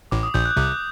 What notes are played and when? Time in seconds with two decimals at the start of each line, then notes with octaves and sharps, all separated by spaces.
0.11 A1 A2 D6
0.23 D#6
0.34 A#1 A#2 G6
0.45 F#6
0.57 C2 C3 D6